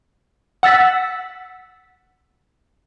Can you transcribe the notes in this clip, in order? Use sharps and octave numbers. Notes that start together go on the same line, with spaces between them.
F#5 E6 A6 B6